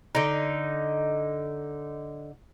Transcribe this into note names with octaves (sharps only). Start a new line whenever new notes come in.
D3 D#4